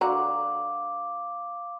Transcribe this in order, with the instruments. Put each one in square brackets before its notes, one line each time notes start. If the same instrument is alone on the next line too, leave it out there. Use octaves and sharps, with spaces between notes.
[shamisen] D3 F#4 A#5 [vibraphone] F5 C6 D6